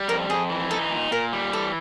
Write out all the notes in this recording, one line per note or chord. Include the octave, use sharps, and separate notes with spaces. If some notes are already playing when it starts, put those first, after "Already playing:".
Already playing: G3
F2 A#4
F2 G#4
E3
D#4 A4
A#2
A#2 A#4
G3
E3 A4